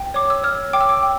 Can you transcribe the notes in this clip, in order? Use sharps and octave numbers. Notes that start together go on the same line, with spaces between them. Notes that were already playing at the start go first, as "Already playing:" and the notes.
Already playing: G5
C#5 D6
E6
C#5 F6
G5 D6
E6
D6
G5